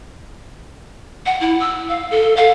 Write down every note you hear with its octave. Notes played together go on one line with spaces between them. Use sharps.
F#5
E4
E6
F5
A4
F5